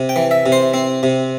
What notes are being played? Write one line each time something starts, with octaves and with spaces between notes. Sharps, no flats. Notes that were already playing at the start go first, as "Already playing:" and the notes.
Already playing: C3
G5
E3
E5
C3
C5
C4
C3